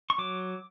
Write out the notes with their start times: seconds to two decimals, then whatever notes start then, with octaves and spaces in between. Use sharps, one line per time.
0.10 C#6
0.18 F#3 D6